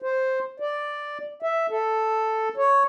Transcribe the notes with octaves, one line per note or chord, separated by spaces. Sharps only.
C5
D5
E5
A4
C#5